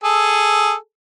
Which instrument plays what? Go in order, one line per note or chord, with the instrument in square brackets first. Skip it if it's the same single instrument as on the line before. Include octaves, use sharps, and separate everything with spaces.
[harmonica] G#4 A4